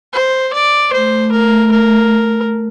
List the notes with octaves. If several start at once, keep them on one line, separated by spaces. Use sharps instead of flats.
C5
D5
A3 C5
A#4
A#4